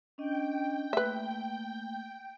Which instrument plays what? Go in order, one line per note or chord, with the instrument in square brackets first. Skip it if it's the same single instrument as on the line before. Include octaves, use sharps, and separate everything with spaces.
[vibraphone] C#4 D4 D#5 [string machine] G5
[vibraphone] A3 A#3 [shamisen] B4 E5